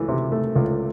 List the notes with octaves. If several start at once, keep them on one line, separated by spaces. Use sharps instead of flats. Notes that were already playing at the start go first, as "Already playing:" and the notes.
Already playing: C#2 E3 A3
C3
A3
C#2